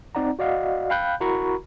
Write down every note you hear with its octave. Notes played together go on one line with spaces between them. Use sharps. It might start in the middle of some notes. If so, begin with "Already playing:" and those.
C4 D#4 D5 F#5 A#5
F#4 D5 D#5 F5 F#5
F5 G5 B5 F#6 G6
E4 F#4 A#4 A#5 B5 C#6